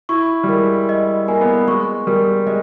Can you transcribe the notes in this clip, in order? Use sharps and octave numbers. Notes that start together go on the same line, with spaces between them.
E4 C#6
G3
G#3 A#4
D#5
A#3 G#5
B3
A#3
G#3 C#6
G3 A#4
G#3 D#5